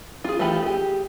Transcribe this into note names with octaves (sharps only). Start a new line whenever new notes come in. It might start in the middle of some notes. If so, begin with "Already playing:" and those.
F4 G#4
E3 A3 F4 G4 B5
G4 G#4